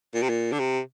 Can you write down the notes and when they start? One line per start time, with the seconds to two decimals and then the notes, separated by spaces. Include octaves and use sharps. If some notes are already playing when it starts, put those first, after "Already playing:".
0.15 A#2
0.23 C3
0.29 A#2
0.53 D3
0.60 C3